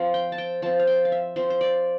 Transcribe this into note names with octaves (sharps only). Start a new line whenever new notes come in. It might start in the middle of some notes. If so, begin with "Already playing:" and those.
Already playing: F3 C4 F5
G5
A5
G5
F3 C4 A5
F5
G5
F5
E5
F3 C4 C5
C5
D5